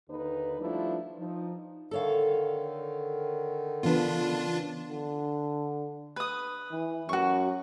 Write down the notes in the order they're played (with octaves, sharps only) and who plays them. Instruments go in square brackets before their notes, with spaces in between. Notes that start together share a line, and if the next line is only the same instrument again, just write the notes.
[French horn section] D#2 D3 D#4 B4
F3 G3 A3 D4 E4 F4
F3 D#4
[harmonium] D3 D#3 [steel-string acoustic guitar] A4 C#5 F5
[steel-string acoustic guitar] C#3 B4 [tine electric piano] E3 B3 [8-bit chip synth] D4 F4
[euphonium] D3
[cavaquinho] B4 D#6
[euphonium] E3
[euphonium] F#2 [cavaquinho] F#4 C#6